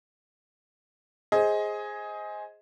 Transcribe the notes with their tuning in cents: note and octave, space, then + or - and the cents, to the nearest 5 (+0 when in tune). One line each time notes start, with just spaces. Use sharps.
G#4 +0 C5 +10 D#5 +20